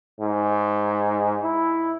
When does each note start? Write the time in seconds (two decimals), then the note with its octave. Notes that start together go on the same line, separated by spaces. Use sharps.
0.21 G#2
1.43 E4